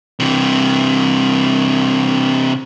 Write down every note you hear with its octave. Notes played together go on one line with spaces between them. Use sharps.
C3 E3